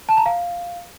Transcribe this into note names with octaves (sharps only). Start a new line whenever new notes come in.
A5
A#5
F5